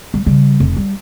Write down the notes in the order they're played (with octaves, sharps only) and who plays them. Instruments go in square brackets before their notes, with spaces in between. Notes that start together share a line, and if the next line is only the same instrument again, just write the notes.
[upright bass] G3
C#3 G3
F1
G3